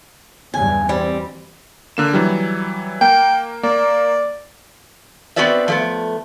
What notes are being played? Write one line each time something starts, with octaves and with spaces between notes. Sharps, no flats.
E2 G2 C#3 G#5
G3 C4
D3 A#3 E7
E3 F#3 G3
A#3 G5
A#3 D5
B3 C4 F#4 B4 D5 E5
F3 A3 B3